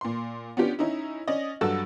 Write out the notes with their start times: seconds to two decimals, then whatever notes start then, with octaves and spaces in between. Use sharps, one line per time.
0.01 A#2 C6
0.57 B3 C#4 D4 F4 G4
0.79 C#4 D#4 E4
1.27 C#4 D5 D#5
1.61 G2 F#3 F#4 A4 E6